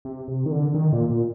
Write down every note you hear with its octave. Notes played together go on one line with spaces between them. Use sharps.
C3
C3
D#3
D3
D#3
A#2
A#2